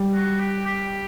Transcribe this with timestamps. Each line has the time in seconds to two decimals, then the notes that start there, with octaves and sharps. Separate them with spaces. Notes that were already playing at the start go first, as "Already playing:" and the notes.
Already playing: G3
0.14 F#4
0.40 G4
0.66 G4